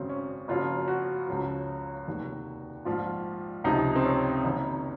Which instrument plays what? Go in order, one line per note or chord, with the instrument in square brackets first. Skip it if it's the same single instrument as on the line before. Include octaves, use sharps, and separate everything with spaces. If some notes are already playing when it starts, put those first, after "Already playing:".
Already playing: [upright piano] G#1 F#2 C#3 C4
C#4
F#1 F#2 F3 F4
F#4
C#2 C#3 F3
F1 D#2 D#3
A#1 G#2 F3 F4
C#2 C3 F3 D#4
C4
C#4
F#1 F#2 D#3